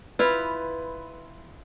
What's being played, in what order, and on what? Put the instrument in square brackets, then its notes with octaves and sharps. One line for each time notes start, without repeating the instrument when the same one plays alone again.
[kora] E4 F4 F5 [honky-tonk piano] B4